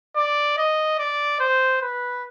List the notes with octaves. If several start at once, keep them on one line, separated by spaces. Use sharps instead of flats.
D5
D#5
D5
C5
B4